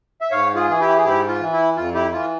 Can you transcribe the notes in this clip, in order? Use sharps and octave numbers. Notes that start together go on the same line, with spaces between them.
E5
G#2 C#5 F5
F4 G#4
E3 G#4
E4 G4
G#4
G#2 E4 G4
F4
E3
E4
F2 F4
E4 G4
E3 F4